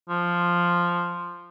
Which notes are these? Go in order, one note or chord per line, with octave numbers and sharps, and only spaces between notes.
F3